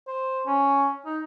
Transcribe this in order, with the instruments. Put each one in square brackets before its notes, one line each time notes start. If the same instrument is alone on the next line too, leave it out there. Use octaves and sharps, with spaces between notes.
[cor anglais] C5
C#4
D#4